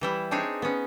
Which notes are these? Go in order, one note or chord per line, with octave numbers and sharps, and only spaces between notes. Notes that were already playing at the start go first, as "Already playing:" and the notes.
E3 G3 E4
C4 D4 D#4 G#4 C#5
B3 C#4